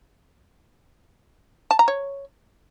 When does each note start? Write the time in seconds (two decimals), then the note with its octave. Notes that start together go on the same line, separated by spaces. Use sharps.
1.71 A5
1.79 A#5
1.88 C#5